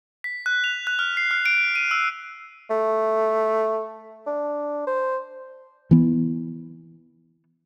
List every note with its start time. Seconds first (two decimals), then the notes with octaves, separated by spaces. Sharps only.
0.24 B6
0.46 F#6
0.64 F7
0.87 F#6
0.99 F6
1.17 C7
1.31 F6
1.46 D7
1.75 D#7
1.91 E6
2.70 A3
4.26 D4
4.87 C5
5.91 E3 B3